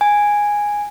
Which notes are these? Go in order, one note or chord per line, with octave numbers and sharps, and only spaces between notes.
G#5